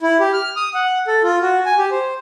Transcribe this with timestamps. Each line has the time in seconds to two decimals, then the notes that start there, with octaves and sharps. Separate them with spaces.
0.01 E4
0.20 G4
0.33 F6
0.56 D#6
0.74 F#5
1.07 A4
1.23 F4
1.42 F#4
1.66 G#5
1.78 G4
1.91 C5